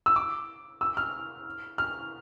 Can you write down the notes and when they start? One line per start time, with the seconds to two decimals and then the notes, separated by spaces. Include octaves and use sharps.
0.06 E6
0.16 D6
0.81 E6
0.97 F6
1.78 F6